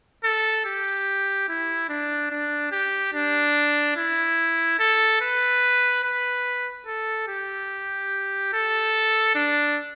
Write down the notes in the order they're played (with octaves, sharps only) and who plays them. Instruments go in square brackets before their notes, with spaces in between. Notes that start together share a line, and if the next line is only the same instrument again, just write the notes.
[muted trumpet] A4
G4
E4
D4
D4
G4
D4
E4
A4
B4
B4
A4
G4
A4
D4